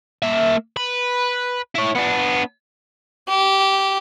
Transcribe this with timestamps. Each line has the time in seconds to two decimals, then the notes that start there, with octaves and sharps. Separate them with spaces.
0.23 A#3 E5
0.77 B4
1.75 E4 C#5
1.95 B3 D4
3.28 G4